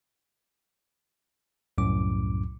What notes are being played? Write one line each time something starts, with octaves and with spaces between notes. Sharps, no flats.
C2 F#2 A2 D6